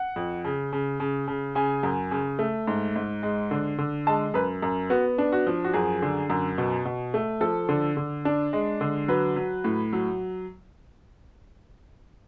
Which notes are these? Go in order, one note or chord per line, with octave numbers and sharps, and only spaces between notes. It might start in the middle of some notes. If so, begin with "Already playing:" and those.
Already playing: F#5
F2
C#3
C#3
C#3
C#3
C#3 G#5
F#2
C#3
A3
G#2
G#2
G#3
D3
D3
G#3 A5
F#2 B4
F#2
B3 F#4
D4
F#4
F3
F#4
F#2 G#4
D3
F#2
B2
B2
A3
F3 A4
D3
D3
D4
G#3
D3
F#3 B4
F#3
A2
F#3